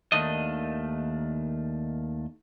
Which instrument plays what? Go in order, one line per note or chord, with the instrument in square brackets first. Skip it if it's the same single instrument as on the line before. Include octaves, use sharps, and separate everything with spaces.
[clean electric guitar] D#2 D#3 A3 D4 D#5